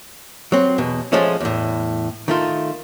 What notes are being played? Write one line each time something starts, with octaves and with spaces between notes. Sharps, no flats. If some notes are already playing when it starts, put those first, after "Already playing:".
F#3 C4
E2 B2
F3 G#3 A3 C#4
E2 A2
D#3 A3 F4